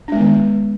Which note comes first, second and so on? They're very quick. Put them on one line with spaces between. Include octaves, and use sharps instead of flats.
D4 G#3 B3 D#3